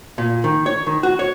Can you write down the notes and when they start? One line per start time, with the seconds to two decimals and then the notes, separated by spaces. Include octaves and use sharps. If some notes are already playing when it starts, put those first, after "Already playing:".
0.18 A#2
0.44 D#3
0.66 C#5
0.87 D#3
1.03 F#4
1.19 C#5